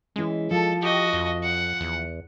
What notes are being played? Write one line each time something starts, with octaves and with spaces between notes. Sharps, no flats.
E3 G#3 C#4
F3 A4
F#4 G4 D#5
F2
F#5
E2